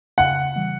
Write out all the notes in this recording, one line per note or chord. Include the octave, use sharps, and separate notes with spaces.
C#3 F#5
E3 G3